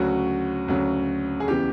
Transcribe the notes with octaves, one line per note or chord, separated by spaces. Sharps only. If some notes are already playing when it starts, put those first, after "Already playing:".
Already playing: D2 C#3 F#3 F#4
D2 C#3 F#3
G#4
E2 C#3 E3 G4